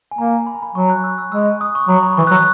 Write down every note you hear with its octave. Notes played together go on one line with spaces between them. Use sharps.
G#5
A#3 A#5
B5
A#5
B5
F#3 C#6
F#6
E6
E6
G#3 E6
D#6
C#6
F#3 B5
A#5
B5
E3 C#6
F#6
F#3 E6